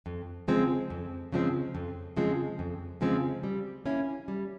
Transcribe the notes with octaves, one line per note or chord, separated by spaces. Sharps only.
F2
C#3 F3 G#3 C4
F2
C#3 F3 G#3 C4
F2
C#3 F3 G#3 C4
F2
C#3 F3 G#3 C4
G3
A#3 C#4 E4
G3